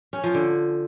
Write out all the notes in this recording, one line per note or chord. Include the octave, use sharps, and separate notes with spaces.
C#4
F3
D3